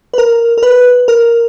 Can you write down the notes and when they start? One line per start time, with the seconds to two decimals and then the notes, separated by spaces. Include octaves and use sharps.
0.14 B4
0.18 A#4
0.58 A#4
0.63 B4
1.08 A#4